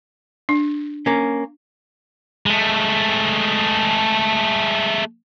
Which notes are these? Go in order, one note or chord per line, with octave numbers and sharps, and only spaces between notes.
D4
A#3 C#4
G#3 A3